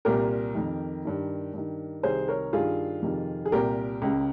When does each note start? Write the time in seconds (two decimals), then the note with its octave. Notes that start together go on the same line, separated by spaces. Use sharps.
0.05 C2 A#2 G4 A#4
0.55 F2 D#3
1.05 G2 D#3
1.54 G2 D#3
2.03 C2 C3 D#3 G#4 C5
2.28 A#4 C#5
2.53 G2 D#3 F4 G#4
3.02 F2 C3 D#3
3.46 G#4
3.52 C2 A#2 G4 A#4
4.02 C#2 C#3